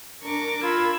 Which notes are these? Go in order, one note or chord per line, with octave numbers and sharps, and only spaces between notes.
D4 A#4 C#6 D6
F4 B5 E6 G#6